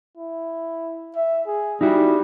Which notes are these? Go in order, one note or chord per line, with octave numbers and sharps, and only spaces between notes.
E4
E5
G#4
G3 D#4 E4 F#4